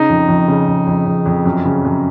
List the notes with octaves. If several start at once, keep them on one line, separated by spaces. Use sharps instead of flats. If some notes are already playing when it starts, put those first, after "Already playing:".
Already playing: C#3 D#4
F2
F2
C#3
F2
F2
F2
F2
F#2
C#3
F#2